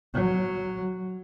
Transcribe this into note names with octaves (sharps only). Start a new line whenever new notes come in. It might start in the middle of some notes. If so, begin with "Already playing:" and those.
F#3